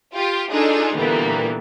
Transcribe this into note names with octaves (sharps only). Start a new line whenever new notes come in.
F4 G4
D4 D#4 F4 G#4 A4
A#2 D3 E3 G3 A#3 B3